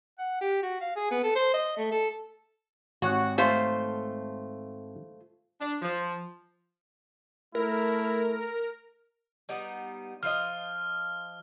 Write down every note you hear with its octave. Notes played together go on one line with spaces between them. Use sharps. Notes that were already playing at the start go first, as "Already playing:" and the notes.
F#5
G4
F#4
F5
G#4
B3
A4
C5
D#5
A3
A4
G#1 F#4 C#5 F#5
A3 F4 C5
D4
F3
A3 E4 A#4
G3 B3 D#4
F3 F4 D#5 F6